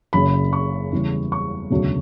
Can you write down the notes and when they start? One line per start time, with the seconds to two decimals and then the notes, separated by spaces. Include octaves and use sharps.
0.13 F#1 F#2 C#3 B5
0.53 C#6
0.91 E2 C#3 E3 G3
1.32 C#6
1.70 E1 D2 C#3 F#3